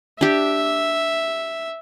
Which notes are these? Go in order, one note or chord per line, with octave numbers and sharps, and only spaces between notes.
D4 G4 E5